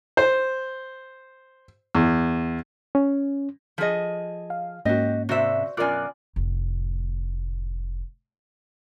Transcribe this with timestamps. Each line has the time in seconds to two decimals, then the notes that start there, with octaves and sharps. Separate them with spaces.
0.17 C5
1.95 E2
2.95 C#4
3.78 F3 G#4 A4 D#5
4.50 F5
4.85 G#2 A#3 C#4 F#4 G4 D#5
5.29 C3 F#4 C5 D5 E5
5.77 F#2 B2 F4 A#4 D5 G#5 D6 F#6
6.36 F1 A2